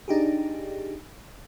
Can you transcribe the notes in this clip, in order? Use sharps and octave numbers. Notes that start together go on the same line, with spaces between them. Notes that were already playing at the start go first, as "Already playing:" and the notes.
D4 D#4 G4 G#4